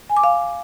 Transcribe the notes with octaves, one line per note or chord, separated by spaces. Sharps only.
G#5
D6
F5